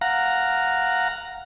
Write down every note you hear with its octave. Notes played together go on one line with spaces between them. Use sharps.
F5 F#5 A#5